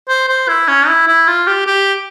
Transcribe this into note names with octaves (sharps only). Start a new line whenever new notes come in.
C5
C5
E4
C#4
E4
E4
F4
G4
G4